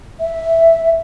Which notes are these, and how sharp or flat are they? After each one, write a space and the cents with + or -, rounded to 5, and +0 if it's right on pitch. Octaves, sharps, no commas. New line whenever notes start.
E5 -5